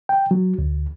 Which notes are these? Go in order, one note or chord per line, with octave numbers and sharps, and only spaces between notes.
G5
F#3
D2